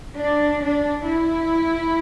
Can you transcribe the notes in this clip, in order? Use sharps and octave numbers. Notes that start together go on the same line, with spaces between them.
D4
D4
E4